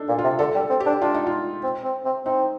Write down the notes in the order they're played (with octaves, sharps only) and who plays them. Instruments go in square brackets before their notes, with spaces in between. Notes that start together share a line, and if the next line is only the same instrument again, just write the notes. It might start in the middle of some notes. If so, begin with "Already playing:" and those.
Already playing: [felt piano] D4 D#4 A4
[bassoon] A#2
[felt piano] F4
[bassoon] C3
[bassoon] D3 [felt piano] A4
[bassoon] G3
[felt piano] A4
[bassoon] C4
[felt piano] G4
[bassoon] D4
[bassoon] D4 [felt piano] F4
[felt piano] D#4
F4
[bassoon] C4
C4
C4
[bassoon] C4 [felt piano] D#4